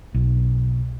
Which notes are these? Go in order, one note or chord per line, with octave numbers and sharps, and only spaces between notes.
B1